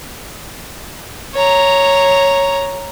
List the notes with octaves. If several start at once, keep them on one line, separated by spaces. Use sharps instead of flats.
C#5 A#5